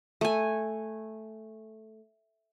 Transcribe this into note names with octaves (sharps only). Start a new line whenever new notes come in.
A3 G#5